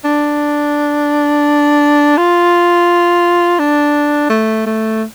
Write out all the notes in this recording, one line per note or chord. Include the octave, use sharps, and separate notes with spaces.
D4
F4
D4
A3
A3